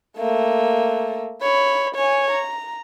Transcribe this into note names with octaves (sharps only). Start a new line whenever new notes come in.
A3 A#3
C#5 B5
C#5 G#5
A#5